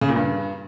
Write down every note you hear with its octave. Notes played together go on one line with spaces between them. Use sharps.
C#3
A#2
G2